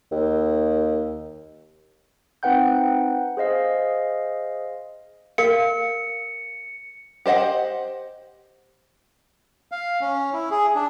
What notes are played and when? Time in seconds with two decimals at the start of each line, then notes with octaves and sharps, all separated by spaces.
0.11 D#2
2.43 C4 D#4 B4 F#5 G5 G6
3.37 G#4 C5 D#5 F5
5.38 A#4 F5 C#7
7.26 G4 C5 D#5 F#5
9.72 F5
10.01 C#4
10.33 E4
10.51 G#4
10.75 D4